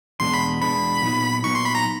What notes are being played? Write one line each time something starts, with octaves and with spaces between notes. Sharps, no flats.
E2 B2 G#3 B3 D4 C6
B5
E2 B2 G#3 B3 D4 B5
A#2 F#3 B3 D#4
A#2 F#3 B3 D#4 C#6
C6
B5
A#5